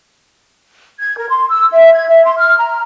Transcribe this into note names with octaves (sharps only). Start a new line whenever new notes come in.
G#6
A#4
C6
E6
E5
G#6
E5
C6
F6
A#5